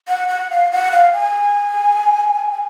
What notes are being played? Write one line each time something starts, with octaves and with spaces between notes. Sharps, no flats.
F#5
F#5
F5
F#5
F5
G#5